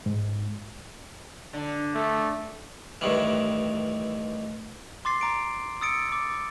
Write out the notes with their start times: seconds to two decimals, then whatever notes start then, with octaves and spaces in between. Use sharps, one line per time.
0.06 G#2
1.53 D3
1.95 A3
3.01 A1 G2 D#3 E3
5.05 C6 D6 A6 C7
5.21 A#5 D7
5.81 D#6 E6 A6 C#7 D7
6.08 D6 A6